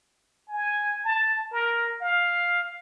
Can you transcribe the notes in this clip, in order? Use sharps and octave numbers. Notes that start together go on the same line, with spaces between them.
G#5
A5
A#4
F5